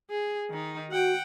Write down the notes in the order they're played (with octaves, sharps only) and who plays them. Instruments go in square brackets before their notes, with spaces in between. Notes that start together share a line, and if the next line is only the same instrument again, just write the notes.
[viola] G#4
D#3 D#4
[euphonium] F#4 [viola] F#5 G5